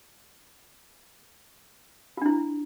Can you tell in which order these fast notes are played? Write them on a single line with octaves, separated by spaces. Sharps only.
F4 D4 E4